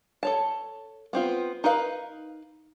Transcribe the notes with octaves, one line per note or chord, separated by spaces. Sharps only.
A4 C#5 A5
B3 C4 F4
D#4 A#4 B4 F5